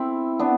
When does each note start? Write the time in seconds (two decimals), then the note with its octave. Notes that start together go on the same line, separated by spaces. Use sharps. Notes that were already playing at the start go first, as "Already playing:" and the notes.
Already playing: C4 E4
0.39 B3 D4